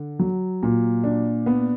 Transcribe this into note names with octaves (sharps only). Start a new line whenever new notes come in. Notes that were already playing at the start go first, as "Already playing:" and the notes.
Already playing: D3
F#3
A#2
D4
B3